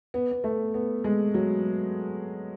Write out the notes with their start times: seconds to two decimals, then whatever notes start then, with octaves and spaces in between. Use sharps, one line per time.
0.14 B3
0.31 B3
0.44 A3
0.74 B3
1.04 G#3
1.34 F#3